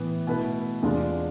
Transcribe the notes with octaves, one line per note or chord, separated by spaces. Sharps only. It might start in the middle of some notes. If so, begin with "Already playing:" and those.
Already playing: A2 E3 B3
B2 A3 E4 B4
E2 C3 G#3 D4 F4